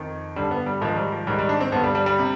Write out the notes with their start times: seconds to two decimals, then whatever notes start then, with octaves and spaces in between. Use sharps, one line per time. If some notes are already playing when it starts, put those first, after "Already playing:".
Already playing: F2 D#3
0.36 G2 D3 G3
0.51 B3
0.66 G3
0.81 G#2 D#3 F3
0.96 G3
1.12 F3
1.27 G#2 D#3 G3
1.39 G3
1.49 D4
1.61 C4
1.72 G2 D3 B3
1.84 G3
1.95 G3
2.06 G3
2.19 C3